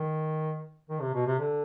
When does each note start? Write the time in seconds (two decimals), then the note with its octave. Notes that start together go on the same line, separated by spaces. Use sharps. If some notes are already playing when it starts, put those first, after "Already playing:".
Already playing: D#3
0.89 D#3
1.01 C3
1.14 B2
1.26 C3
1.39 D3